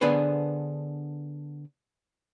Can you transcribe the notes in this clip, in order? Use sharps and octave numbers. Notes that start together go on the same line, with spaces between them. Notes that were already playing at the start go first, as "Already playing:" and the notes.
D3 B3 D4 G#4 B4 C5